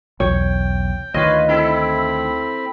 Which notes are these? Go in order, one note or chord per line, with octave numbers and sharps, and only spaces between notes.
B1 E2 C#5 G5
D2 D#3 F4 B4 C#5 D#5 C6
C4 E4 A4 B5